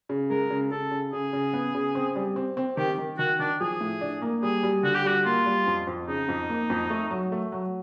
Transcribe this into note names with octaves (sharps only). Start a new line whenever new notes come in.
C#3
G#3 A#4
C#3
C#3 A4
C#3
C#3 G#4
C#3
B3
C#3
C4
G3
C4
C4
D#3 G4
D#3
D#3 F#4
D#3 D4
F3 G#4
A2
D4
A#3
G3 G#4
G3
D3 F#4
G4
G3 F#4
A#3 F4
G3
F2
F2
C#3 D#4
F2
A#3
F2
A3
F#3
A3
F#3